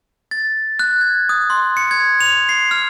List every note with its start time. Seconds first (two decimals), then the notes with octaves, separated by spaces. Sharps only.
0.31 A6
0.79 F#6
1.01 G#6
1.29 D#6
1.50 C6
1.77 C#7
1.91 G#6
2.21 F7
2.49 C7
2.71 F6